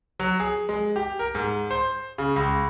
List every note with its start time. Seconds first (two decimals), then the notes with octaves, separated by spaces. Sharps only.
0.20 F#3
0.40 G#4
0.69 G#3
0.96 G4
1.19 A#4
1.35 G#2
1.71 C5
2.18 C#3
2.36 C#2